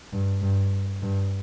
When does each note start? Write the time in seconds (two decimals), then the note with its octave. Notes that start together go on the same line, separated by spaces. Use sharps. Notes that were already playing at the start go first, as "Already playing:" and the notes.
0.13 G2
0.42 G2
1.02 G2